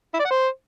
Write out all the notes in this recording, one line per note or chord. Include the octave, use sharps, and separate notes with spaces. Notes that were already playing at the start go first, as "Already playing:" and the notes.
E4
D5
F#5
C5